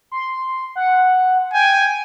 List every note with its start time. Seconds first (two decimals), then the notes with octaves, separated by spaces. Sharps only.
0.12 C6
0.76 F#5
1.53 G5 G#5